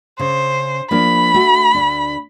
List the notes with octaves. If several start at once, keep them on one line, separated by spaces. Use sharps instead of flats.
C#3 C5
F3 A#3 D4 B5
A3 F#4
D2 D4